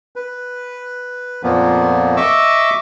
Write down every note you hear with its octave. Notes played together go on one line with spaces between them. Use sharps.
B4
F2 A#2 F3 A#3 B3
D#5 E5 C#6 D6 E6